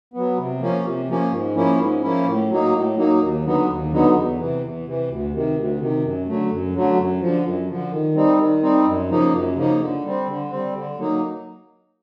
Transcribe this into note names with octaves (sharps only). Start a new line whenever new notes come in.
F#3 B3
C3
F3 A#3 C#4
C3
F3 A#3 C#4
G#2
F3 A#3 C#4 E4
G#2
F3 A#3 C#4 E4
A2
F#3 A#3 D#4
A2
F#3 A#3 D#4
D#2
D3 F#3 B3 D#4
D#2
D3 F#3 B3 D#4
E2
C3 E3
E2
C3 E3
D2
C3 D#3
D2
C3 D#3
F#2
D3 F#3 A3
F#2
D3 F#3 A3
F#2
D3 F3
F#2
D3 F3
D#3
G3 C4 D#4
D#3
G3 C4 D#4
F#2
C#3 F3 A#3 D#4
F#2
C#3 F3 A#3 D#4
D3
G3 C4
D3
G3 C4
D3
F#3 A#3 D#4